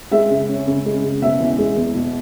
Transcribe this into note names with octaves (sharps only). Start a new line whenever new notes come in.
G#3 E5
C#3
C#4
C#3
G#3
C#3
B2 E5
E2
G#3
E2
B2